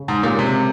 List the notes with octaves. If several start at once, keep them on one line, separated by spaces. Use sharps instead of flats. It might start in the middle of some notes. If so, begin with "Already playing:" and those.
Already playing: C#3
G#2
A#2 C#3 G#3 C#4 G4 A#4
C3